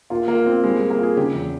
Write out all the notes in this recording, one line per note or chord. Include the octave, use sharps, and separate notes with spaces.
A#3 F4
A#3 F4
C4 F4
G3 G#3
G#3 F4
A#3
F4 G#4
C#3 G4
E2